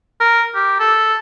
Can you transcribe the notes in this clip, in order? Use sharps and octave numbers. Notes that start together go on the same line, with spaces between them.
A#4
G4
A4